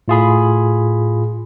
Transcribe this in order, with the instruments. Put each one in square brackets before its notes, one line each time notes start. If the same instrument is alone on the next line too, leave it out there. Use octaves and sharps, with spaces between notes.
[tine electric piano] A2 F4 G#4 B5